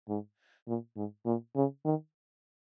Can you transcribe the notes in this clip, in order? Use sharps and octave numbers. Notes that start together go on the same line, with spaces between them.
G#2
A#2
G#2
A#2
C#3
D#3